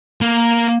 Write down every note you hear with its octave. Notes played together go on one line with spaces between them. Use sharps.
A#3